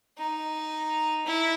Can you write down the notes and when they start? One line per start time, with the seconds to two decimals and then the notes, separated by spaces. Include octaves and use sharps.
0.19 D#4
1.26 E4